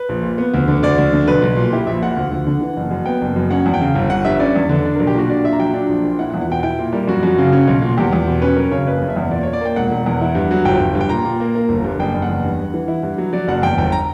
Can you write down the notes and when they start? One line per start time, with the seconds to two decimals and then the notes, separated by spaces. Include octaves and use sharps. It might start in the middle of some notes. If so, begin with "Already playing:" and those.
Already playing: B4
0.09 A#1
0.23 A#2
0.38 B3
0.54 D2
0.68 D3
0.83 D2 D5
0.98 D2
1.13 D3
1.28 B1 B4
1.42 B1
1.57 A#2
1.73 E4 G4
1.87 A#1 E5
2.03 A#2 F#5
2.16 D2
2.31 D2
2.47 D3
2.61 E3
2.77 F#1
2.91 F#2
3.06 B3 G5
3.21 F#1
3.36 F#2
3.51 C#4 F#5
3.66 E2
3.74 G5
3.81 C#3
3.95 G1
4.10 G1 F#5
4.25 G2 E5
4.40 C#4 D5
4.56 E2
4.69 D3
4.85 D4
4.95 B1 A#4
5.07 G4
5.14 A#2 F#4
5.29 D4 D5
5.44 A#2 E5
5.53 A#5
5.59 F#3 G5
5.74 D4
5.89 A#1
6.04 A#2
6.19 E4 F#5
6.30 F#5
6.34 E2
6.41 F#5
6.49 B2 G5
6.63 E4 G5
6.79 A#2
6.93 G3 A#4
7.07 F#2 F#4
7.23 F#2
7.38 C#3
7.52 C#4
7.67 B1
7.82 A#2
7.97 E2 G4
8.13 E2
8.28 B2
8.42 C#4 B4
8.56 F#2 A#4
8.71 C#3 C#5
8.87 F#1 B4
9.02 F#1
9.09 E5
9.16 E2
9.31 A#2 D5
9.43 A#2 C#5
9.53 D5
9.61 A#3 G5
9.76 E1 F#5
9.92 E1
10.06 E2
10.21 E4
10.35 G2
10.51 F#3
10.65 G1 G5
10.81 G1
10.95 G2
11.01 G5
11.09 A#2 A#5
11.25 A#2
11.40 A#3
11.55 A#3
11.69 G1
11.84 G2
11.99 F#1 G5
12.14 F#1
12.22 F#5
12.29 E2
12.44 G2
12.58 G2
12.74 E3
12.88 E4
13.03 G2
13.18 F#3
13.33 F#3 D5
13.48 F#1 F#5
13.62 E2 G5
13.78 G1 G5
13.92 A#5